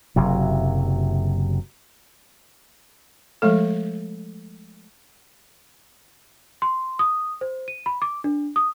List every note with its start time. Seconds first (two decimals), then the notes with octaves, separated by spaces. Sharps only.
0.16 F#1 C3 F#3
3.42 F3 G#3 A3 A4
6.62 C6
6.99 D#6
7.41 C5
7.68 D#7
7.86 B5
8.02 D6
8.24 D4
8.56 D#6